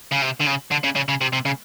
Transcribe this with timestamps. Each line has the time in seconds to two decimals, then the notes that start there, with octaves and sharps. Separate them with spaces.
0.12 C#3
0.22 C3
0.41 D3
0.47 C#3
0.72 D3
0.84 C#3
0.96 C#3
1.08 C#3
1.21 C3
1.33 C3
1.45 C#3